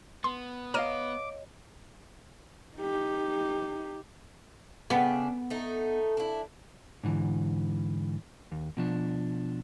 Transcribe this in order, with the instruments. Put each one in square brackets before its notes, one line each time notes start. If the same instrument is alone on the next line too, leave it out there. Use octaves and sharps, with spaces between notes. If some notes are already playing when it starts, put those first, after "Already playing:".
[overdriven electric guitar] B3 [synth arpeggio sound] C6
[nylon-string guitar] C#5 D#5 F5 [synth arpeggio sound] A#5 F6 D#7 [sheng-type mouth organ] D6
[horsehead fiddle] D#4 G4
[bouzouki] C#3 D4 G5 [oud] B3
[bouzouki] A3 D#4
D4 E4
[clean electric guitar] G#2 D3 E3
D#2
B2 F3 D4